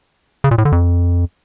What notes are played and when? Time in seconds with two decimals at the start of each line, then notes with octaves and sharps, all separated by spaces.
0.44 C#3
0.51 A#2
0.58 A2
0.65 D3
0.72 F2